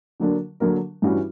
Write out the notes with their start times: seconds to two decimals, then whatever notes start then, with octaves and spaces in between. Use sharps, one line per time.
0.20 D3 F#3 A#3 D4 A#4
0.60 D3 F#3 A#3 D4 A#4
1.02 G2 E3 G3 C#4 F#4